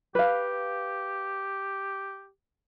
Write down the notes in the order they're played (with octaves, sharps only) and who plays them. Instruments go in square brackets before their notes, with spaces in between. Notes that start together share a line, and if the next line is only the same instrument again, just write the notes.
[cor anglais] G4 [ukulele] B4 F5